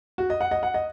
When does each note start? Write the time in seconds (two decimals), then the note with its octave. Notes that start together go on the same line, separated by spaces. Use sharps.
0.18 F#4
0.30 D#5
0.41 F#5
0.51 D#5
0.63 F#5
0.74 D#5